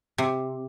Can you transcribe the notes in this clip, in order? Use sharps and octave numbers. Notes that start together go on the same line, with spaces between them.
C3